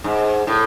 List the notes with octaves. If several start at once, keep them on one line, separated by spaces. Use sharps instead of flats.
G#2
A2